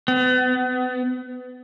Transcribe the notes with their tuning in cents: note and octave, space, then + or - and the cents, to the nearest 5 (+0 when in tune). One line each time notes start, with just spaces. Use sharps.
B3 +35